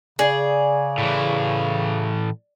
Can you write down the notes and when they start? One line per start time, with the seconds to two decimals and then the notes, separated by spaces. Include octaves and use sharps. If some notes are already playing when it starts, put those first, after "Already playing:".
0.19 C#3 G#4 D5
0.98 A2 E3